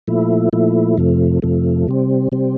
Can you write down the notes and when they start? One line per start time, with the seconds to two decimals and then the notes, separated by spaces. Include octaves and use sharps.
0.08 A#2 F3 A3 E4
0.53 A#2 F3 A3 E4
0.97 F2 C3 F3 A3
1.42 F2 C3 F3 A3
1.88 C3 G3 C4
2.32 C3 G3 C4